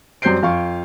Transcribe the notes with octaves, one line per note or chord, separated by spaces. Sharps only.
F#2 G3 C4 G6 C7 D7
F2 F5 C#6